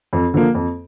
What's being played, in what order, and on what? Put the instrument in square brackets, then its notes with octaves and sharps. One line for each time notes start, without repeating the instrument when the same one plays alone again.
[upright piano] F2
D3 F3 A#3
F2